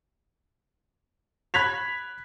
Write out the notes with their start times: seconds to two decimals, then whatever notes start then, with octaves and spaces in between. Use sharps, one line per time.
1.54 B5 F#6 G#6 B6 F7